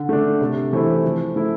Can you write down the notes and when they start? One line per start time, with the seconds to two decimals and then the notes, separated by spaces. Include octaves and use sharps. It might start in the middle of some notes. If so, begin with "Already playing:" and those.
Already playing: D3
0.09 A3 D4
0.41 C3
0.73 E3 A3 C4 E4
1.04 F3
1.36 A3 E4